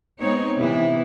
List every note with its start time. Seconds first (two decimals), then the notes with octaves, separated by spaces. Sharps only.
0.20 G#3 B3 C4 D#4 C#5
0.59 C3 E3 B3 E4